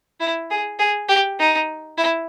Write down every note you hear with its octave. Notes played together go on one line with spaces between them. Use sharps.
E4
G#4
G#4
G4
D#4
E4